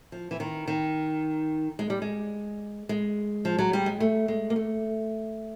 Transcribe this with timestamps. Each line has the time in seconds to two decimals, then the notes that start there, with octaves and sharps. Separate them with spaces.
0.12 F3
0.31 E3
0.40 D#3
0.68 D#3
1.79 G#3
1.90 G3
2.02 G#3
2.89 G#3
3.45 F3
3.59 F#3
3.73 G3
3.86 G#3
4.00 A3
4.28 G#3
4.50 A#3
4.56 A3